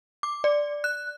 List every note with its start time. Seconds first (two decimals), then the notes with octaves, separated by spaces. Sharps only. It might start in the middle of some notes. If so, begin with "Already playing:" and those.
0.23 D6
0.44 D5
0.84 F#6